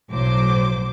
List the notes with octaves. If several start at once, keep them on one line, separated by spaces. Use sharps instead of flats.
B1 A2 F#3 C5 D6